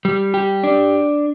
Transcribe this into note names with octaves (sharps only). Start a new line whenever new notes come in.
G3
G4
D4